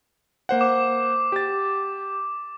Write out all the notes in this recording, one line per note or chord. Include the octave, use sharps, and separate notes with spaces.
A#3 C5 F#5
D6
G4 A6